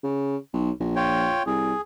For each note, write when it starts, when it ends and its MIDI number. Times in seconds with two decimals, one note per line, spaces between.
0.03 0.36 49
0.53 0.70 35
0.80 1.32 34
0.96 1.43 65
0.96 1.43 73
0.96 1.43 79
1.46 1.73 36
1.46 1.81 68